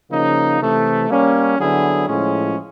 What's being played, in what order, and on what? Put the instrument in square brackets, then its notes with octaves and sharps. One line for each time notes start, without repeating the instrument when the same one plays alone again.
[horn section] C#3 F3 A#3 D#4
C3 E3 A3
G3 A#3 C#4
D3 F#3 B3 E4 G#4
A2 F3 G#3 C#4